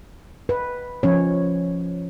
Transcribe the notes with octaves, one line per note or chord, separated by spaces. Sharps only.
B4
F3 C#4 C#5